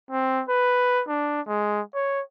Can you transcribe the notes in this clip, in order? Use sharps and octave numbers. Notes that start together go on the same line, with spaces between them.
C4
B4
D4
G#3
C#5